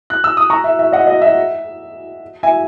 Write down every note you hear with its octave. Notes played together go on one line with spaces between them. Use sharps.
F#6
E6
D#6
A#5 C#6
E5
E5
D#5 F#5
D#5
E5
E5 G#5